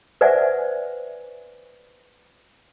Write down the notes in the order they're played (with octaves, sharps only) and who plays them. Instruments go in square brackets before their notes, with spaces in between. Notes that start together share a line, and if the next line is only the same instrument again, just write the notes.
[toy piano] B4 C5 D5 E5 F#5 G#5